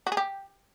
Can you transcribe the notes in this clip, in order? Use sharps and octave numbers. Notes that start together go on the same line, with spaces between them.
F#4
G#4
G4